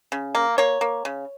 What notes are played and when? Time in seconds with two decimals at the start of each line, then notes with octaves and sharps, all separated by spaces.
0.12 C#3
0.35 A#3
0.58 A#3 C#5
0.81 A#3
1.05 C#3